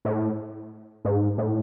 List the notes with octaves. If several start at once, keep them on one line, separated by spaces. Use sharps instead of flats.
A2
G#2
A2